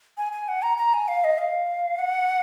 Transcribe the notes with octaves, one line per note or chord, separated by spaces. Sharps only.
G#5
G#5
F#5
A#5
A#5
G#5
F5
D#5
F5
F#5